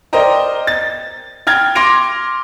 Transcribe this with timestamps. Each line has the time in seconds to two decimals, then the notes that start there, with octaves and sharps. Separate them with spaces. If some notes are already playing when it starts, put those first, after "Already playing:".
0.13 A#4 C5 D5 D#5 G5 A#5
0.67 A6
1.47 G5 F6 G#6 A6
1.75 C6 D6 G#6 A#6 D7 F7